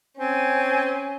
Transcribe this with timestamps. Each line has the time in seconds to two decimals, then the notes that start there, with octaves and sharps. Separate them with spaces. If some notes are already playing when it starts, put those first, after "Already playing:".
0.19 C4 C#4 G#5